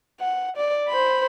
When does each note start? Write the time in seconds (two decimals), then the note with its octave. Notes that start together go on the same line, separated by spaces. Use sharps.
0.20 F#5
0.57 D5
0.89 C5 B5